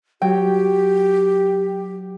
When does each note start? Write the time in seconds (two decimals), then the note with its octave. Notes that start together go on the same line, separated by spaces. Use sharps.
0.22 F#3 G4 G5